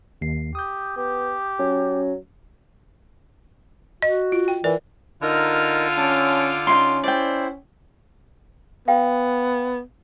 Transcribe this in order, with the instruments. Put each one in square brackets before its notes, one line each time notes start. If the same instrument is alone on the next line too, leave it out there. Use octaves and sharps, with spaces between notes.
[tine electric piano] D#2 C7
[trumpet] G4 [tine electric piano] D#6 G6
[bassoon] B3 [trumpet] G4
[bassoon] F#3 [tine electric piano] C#4
[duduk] F#4 [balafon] D#5
[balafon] F4
G5
[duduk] E3 [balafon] A#4 D5
[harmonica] D3 F4 [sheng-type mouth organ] D#4 A#4 A#5
[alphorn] C#4 [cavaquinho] A5 [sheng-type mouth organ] D6
[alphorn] C#4 [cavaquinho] D#4 E4 C6
[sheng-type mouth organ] E4 C5 [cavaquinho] D5 G5
[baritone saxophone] B3 [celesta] F5 G5